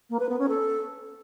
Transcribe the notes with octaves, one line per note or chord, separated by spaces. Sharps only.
A#3
B4
B3
C#4
A4